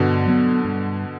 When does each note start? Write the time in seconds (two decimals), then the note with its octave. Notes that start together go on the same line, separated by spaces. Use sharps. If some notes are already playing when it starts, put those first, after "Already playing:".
Already playing: G2 B2 D3
0.26 F#3 B3
0.65 G2